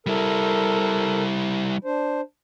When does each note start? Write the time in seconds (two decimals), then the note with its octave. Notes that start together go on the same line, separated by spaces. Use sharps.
0.06 G3 E4 A4 A#4
1.84 D4 C5